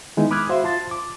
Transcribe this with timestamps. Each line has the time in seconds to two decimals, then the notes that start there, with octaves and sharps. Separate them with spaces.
0.17 D#3 G#3 B3 D#4 E4
0.31 B5 D6 D#6 F6 F#6 G#6
0.49 F#4 C5 E5 F5 C6
0.64 F4 A5 C6 A6
0.91 D6